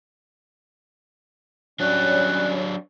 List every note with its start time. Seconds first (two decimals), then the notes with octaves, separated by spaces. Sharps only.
1.80 F#3 G3 C#4 D4 C#5 F#6